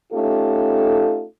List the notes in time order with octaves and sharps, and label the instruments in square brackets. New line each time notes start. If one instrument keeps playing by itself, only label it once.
[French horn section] A3 C#4 D#4 F4 G4 A4